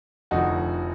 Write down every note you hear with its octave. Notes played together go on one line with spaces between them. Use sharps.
F1 F2 D3 F3 D#4 F#4